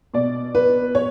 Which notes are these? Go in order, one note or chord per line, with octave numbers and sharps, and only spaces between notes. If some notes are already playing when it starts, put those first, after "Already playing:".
B2 D5
B4
C#5